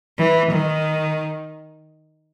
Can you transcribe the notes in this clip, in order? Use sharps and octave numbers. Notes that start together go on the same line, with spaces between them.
E3
D#3